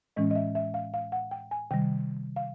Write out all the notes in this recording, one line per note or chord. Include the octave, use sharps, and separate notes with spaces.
A2 E3 G#3 C#4 D#5
D#5
E5
E5
F5
F5
F#5
G5
G#5
C3 D#3 G3 G5
F5